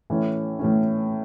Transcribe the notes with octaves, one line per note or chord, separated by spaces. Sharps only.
A2 E3 A3 C#4
A2 E3 A3 C#4